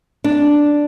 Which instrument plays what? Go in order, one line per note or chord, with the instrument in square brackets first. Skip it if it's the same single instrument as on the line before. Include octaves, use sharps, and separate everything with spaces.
[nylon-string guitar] D4